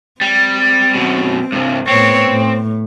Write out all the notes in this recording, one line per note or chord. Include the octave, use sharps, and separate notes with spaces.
G3 C4
F#2 B2
C2 G2
A2 B3 C4 C#5
A2